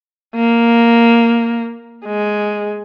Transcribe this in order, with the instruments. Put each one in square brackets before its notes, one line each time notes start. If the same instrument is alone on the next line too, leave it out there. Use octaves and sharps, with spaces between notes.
[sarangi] A#3
G#3